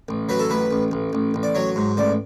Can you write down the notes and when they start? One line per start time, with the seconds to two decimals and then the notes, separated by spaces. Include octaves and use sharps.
0.09 A1
0.29 F#3 B4
0.39 A4
0.50 A1 B4
0.71 A1
0.91 A1
1.13 A1
1.34 A1
1.43 D5
1.55 F#3 C#5
1.76 G#2
1.97 A1 D5